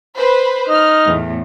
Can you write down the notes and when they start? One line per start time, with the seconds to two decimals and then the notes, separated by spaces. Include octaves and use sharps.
0.17 B4 C5 B5
0.69 D#4 F6
1.07 E2 A2